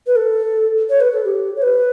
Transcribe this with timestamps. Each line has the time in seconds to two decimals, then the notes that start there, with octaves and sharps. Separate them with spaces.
0.07 B4
0.16 A4
0.89 C#5
1.00 B4
1.12 A4
1.25 G4
1.56 C#5
1.62 B4